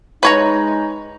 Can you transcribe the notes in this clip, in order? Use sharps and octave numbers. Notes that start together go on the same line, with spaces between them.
G#3 D#4 B4 C#5 A#5